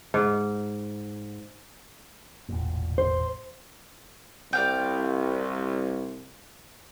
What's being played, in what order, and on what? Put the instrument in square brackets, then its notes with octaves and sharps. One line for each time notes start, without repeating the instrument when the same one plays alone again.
[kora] G#2
[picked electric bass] E1 A1 A#2
[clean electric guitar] C5
[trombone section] C2 [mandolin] D5 F5 G5